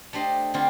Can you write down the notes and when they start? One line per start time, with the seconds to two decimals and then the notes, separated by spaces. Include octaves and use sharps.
0.13 A3 D4 G4 C5 D#5
0.54 D3 G3 C4 F4